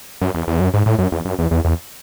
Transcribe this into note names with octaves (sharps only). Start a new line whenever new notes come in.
F#2
E2
E2
F#2
G#2
A2
F#2
E2
F#2
E2
E2
E2